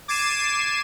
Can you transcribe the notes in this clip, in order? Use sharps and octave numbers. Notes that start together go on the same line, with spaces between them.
D6 G#6 A6 C7 D#7 E7